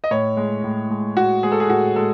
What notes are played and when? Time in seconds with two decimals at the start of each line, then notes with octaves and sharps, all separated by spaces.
0.04 D#5
0.11 A2 C#5
0.37 G#3
0.64 A2
0.90 G#3
1.17 A2 F#4
1.43 G#3 G#4
1.52 A4
1.60 G#4
1.70 A2 F#4
1.96 G#3 A4